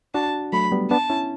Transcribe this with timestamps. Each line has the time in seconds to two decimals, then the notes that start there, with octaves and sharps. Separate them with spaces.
0.14 D4 F#4 A5
0.53 F#3 A3 B5
0.72 G3 B3
0.91 B3 D4 A5
1.10 C#4 E4